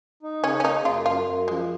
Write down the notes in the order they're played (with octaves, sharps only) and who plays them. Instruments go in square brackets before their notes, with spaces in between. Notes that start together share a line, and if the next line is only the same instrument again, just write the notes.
[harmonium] D#4
[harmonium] C#3 [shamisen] C#4
[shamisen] C#4
[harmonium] A#3 [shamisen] D#4
[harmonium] F#2 [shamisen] F4
[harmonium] F#2 [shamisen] F4
[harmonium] F#2
[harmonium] F3 [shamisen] G#3